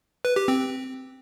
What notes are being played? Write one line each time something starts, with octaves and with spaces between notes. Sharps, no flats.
B4
G4
C4